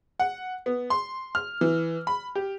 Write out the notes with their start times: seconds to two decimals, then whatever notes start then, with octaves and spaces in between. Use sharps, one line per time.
0.20 F#5
0.66 B3
0.90 C6
1.35 F6
1.61 E3
2.07 B5
2.35 G4